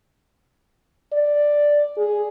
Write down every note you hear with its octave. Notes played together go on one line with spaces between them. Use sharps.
D5
G#4